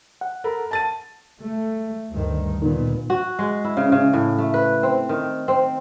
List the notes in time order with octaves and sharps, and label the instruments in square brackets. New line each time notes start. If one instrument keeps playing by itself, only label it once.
[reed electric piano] F#5
[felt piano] A4 A#4 B5
A5 A6 D#7
[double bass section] A3
D2 G2 D#3
[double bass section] A#2 B3 [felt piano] D#3
[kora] F#4
G#3
E4
C#3
C#3
A2
A3
B4
C4
D#3
C4